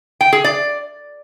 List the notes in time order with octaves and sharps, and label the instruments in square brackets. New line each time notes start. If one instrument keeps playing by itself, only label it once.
[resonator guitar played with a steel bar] G5
G#4
D5